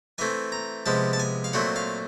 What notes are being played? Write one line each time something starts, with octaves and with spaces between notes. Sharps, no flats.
E3 A3 C4 G#5
A#5
C3 F3 G#3 B3 A5
A5
G#5
F5
A#2 F#3 A3 C4 F#5
F5